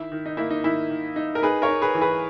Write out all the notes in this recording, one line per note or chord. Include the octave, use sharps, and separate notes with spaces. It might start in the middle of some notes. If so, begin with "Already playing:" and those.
Already playing: D#3 E4
D#3
D#4
A#3 E4
D#4
D#3 E4
D#3
D#4
A#4
D#4 G#4 B4
A#4 C#5
D#4
G#4 B4
E3
G#4 B4